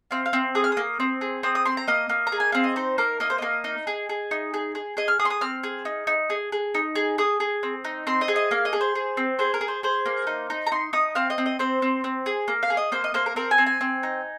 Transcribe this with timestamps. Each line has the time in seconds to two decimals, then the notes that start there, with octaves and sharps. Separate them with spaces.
0.11 C4 F5
0.26 F5
0.33 C4
0.55 G#4 D#6
0.64 F6
0.72 A#3 D#6
1.00 C4
1.21 G#4
1.43 C4 D#6
1.55 D#6
1.65 C4 C6
1.77 A#5
1.88 A#3 D#5
2.09 A#3
2.27 A#5
2.32 G#4
2.40 G#5
2.52 C4 F5
2.64 D#5
2.76 D#4 C5
2.98 A#3 A#4
3.20 A#3 D#5
3.30 C5
3.38 A#3 D#5
3.64 D#4
3.87 G#4
4.09 G#4
4.31 D#4
4.54 G#4
4.75 G#4
4.97 G#4 D#5
5.08 F6
5.19 G#4 D#6
5.25 C6
5.30 D#6
5.41 C4 F6
5.63 G#4
5.85 D#4
6.07 D#4
6.30 G#4
6.52 G#4
6.75 D#4
6.95 G#4
7.18 G#4 D#6
7.40 G#4
7.63 C4
7.84 D#4
8.07 C4 C6
8.21 D#5
8.28 G#4
8.36 D#5
8.51 A#3 F5
8.65 D#5
8.73 G#4
8.81 C5
8.95 G#4
9.17 C4
9.39 G#4 C5
9.54 A#4
9.61 G#4
9.68 C5
9.83 G#4 C5
10.06 A#3
10.27 D#4
10.50 D#4
10.67 A#5
10.72 D#4 C6
10.93 D#4 D#6
11.15 C4 F5
11.30 D#5
11.38 C4
11.46 D#5
11.59 C4 C5
11.82 C4
12.04 C4
12.26 G#4
12.48 A#3
12.63 F5
12.70 G#4
12.77 D#5
12.92 A#3 C5
13.04 D#5
13.14 A#3 C5
13.26 A#4
13.36 C4 A#4
13.51 G#5
13.58 C4
13.66 G#5
13.81 C4
14.03 D#4